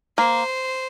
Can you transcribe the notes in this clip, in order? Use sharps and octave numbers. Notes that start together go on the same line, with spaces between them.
A#3 C5